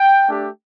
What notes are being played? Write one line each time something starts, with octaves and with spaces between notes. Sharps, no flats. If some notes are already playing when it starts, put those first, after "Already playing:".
Already playing: G5
A3 D4 G4